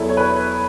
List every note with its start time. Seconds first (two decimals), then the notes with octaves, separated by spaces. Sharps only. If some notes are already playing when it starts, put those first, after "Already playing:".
Already playing: E2 B2 F#3 E4 A4
0.09 C#5
0.17 B4